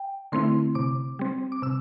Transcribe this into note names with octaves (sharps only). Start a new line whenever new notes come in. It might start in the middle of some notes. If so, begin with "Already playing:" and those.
Already playing: G5
D3 A3 C4 E4 C6
C3 D6
G3 C4
D6
C3 E6